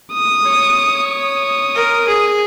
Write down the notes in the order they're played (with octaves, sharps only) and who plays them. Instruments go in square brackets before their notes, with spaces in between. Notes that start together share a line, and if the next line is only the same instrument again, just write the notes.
[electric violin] D#6
[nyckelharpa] C#5
[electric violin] D#6
[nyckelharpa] A#4
G#4